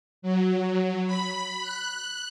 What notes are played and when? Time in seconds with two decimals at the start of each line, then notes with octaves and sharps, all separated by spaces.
0.22 F#3
1.07 B5
1.61 F#6